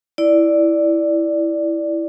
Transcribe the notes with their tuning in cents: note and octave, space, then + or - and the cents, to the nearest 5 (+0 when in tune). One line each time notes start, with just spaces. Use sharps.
E4 +0 D5 +0